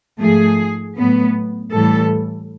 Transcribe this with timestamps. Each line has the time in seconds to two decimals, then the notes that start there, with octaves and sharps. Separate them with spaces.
0.19 G#2 F3 A3 G#4
0.96 A2 F#3 B3
1.73 A2 E3 G3 A4